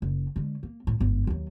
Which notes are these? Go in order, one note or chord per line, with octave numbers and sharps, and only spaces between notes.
F#1
D3 G#3
A#3
A2
G1 G#2
D#2 F#3